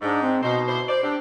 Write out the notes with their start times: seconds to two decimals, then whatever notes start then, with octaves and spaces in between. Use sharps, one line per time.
0.02 G#2 D4
0.22 C4
0.43 B2 D#4 C5
0.68 D3 E4 C5
0.88 C5 D5
1.04 C4 D4 G4